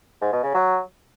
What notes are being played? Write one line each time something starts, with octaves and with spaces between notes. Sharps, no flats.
G#2
B2
C#3
F#3